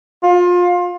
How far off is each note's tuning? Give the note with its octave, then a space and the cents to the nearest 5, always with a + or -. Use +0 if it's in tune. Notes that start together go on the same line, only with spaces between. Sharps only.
F4 +25